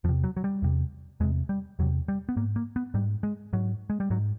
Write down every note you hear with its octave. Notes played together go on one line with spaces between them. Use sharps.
E2 C3 F3
F#3
F#3
G3
E2 C3
E2 C3 G#3
G3
E2 C3 F#3
G3
B3
G#2 A#3
A#3
B3
G#2 G3
G#3
G#2 F#3
G#3
G3
G#2 F#3